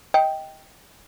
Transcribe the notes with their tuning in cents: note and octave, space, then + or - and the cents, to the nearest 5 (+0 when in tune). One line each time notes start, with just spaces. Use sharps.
D#5 +20 G5 +0